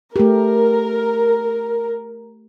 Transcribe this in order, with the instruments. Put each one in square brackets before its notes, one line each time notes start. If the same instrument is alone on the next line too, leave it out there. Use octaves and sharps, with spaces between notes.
[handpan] A3 G4 [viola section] A#4